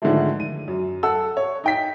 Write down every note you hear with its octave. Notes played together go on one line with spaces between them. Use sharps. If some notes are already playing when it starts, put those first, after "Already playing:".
G#2 D3 D#3 F3 G#3 A3
D#7
F#2
A4 F#5 E6
C#5
D#4 G5 B6